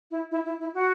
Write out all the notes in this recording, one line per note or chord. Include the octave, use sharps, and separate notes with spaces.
E4
E4
E4
E4
F#4